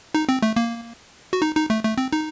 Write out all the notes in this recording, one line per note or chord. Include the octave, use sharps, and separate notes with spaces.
D#4
C4
A3
A#3
F#4
D#4
D#4
A3
A3
C4
D#4